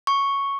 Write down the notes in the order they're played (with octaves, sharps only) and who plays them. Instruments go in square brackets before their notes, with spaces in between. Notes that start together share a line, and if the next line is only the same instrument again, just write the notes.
[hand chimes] C#6